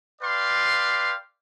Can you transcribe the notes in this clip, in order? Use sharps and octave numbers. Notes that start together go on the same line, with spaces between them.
B4 D5 F5 G5 C6